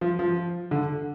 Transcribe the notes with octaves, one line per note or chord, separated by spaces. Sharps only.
F3
F3
D3